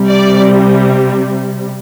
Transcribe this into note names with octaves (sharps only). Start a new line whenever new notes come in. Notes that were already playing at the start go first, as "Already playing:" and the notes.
Already playing: C3 G3
D5